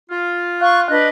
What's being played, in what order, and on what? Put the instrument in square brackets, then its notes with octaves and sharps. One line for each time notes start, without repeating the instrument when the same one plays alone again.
[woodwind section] F4
[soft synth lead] F5 [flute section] C#6 F#6
[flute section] D4 B4 D#5 [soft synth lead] F#6